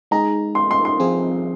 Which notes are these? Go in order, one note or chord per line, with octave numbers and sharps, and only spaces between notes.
G#3 D#4 G#4 A#5
C6
C6
C6
F3 C4 F4 G#4